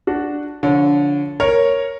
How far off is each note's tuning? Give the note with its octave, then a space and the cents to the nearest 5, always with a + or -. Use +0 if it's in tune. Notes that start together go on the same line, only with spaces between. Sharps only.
D4 +0 F#4 +0
D3 -20 F3 +0 C#5 +0
A#4 +0 C#5 -5